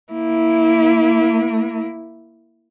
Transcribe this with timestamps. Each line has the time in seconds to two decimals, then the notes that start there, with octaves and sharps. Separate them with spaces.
0.12 A#3 E4